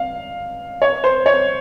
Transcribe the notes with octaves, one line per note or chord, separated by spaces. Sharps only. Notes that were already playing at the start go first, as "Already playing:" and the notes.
Already playing: F5
C#5
C5
C#5